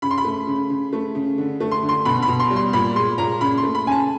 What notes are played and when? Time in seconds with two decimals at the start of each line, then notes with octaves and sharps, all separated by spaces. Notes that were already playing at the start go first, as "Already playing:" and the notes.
0.02 C#3 B5
0.11 C6
0.18 B5
0.25 A3
0.47 C#3
0.70 C#3
0.93 A3
1.15 C#3
1.38 D3
1.60 A3
1.71 C6
1.83 D3
1.89 C6
2.05 B2 B5
2.22 B5
2.28 B2
2.40 C6
2.50 G3
2.56 C6
2.73 A#2 B5
2.96 G#3 C6
3.18 A#2 A#5
3.41 C#3 B5
3.58 C6
3.63 A3
3.75 B5
3.86 C#3 G#5
3.92 A5